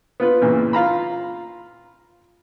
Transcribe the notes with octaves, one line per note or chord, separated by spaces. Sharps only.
B3 F4 B4
G2 A#2 C#3 E3
F4 F5 A#5 B5